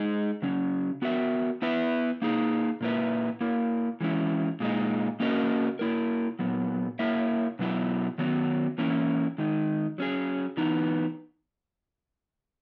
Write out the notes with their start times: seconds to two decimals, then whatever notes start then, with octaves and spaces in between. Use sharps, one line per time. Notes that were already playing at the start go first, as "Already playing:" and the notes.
Already playing: G#3 D#4 G#4
0.42 C#3 F#3 C#4
1.02 B3 F#4 A#4 E5
1.62 B3 E4 B4 E5
2.22 A#3 D#4 G#4
2.81 A#2 A#3 E4 B4 E5
3.41 A#3 E4 A#4
4.01 E3 G#3 C#4 E4
4.60 A#2 G#3 D#4
5.20 A#3 C#4 F#4 A#4 D#5
5.79 A#3 E4 A#4
6.39 A#2 F#3 B3
6.99 A#3 E4 A#4 C#5 E5
7.59 B2 F#3 B3 E4
8.18 D#3 F#3 B3
8.78 E3 A#3 C#4 E4
9.38 D#3 G#3 D#4
9.98 F#3 C#4 G#4
10.57 E3 B3 D#4